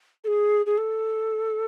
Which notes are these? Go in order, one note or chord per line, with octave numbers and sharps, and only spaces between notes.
A4
G#4
G#4
A4